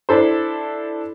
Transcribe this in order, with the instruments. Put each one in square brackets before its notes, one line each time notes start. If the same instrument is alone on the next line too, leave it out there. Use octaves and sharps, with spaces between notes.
[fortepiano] D4 E4 A4 C5